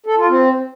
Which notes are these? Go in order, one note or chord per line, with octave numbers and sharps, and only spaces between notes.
A4
F4
C4